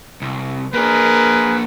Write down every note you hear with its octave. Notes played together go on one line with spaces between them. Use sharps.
C2
A#3 D4 G#4 A#4 B4